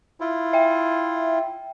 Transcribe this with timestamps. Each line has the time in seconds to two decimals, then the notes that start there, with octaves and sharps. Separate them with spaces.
0.20 E4 F4
0.53 E5 G5